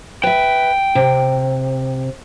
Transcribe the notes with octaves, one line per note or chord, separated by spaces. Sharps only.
B4 E5 G5
C3